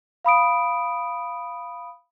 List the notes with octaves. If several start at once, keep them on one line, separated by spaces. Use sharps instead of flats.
F5 B5 D#6 D7